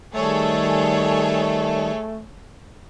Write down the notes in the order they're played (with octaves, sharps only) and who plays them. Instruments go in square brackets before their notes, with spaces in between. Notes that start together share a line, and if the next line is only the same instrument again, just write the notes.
[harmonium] D#3 G3 [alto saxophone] A3 [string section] G#4 A4 C#5